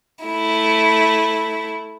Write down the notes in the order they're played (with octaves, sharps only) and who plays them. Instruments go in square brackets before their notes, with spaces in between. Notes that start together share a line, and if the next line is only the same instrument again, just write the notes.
[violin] A3 E4